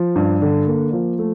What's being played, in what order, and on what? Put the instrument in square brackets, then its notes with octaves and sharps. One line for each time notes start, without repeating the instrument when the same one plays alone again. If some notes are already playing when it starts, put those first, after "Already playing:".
Already playing: [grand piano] F3
G2
D3
A#3
F3
A3